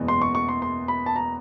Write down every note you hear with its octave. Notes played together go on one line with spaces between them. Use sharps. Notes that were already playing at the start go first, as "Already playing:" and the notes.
Already playing: F#1 E2 B2 G#3 B3
C6
C#6
C#6
C6
C6
B5
A5
A#5